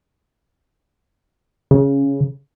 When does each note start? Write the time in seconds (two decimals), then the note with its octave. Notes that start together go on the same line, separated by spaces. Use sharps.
1.71 C#3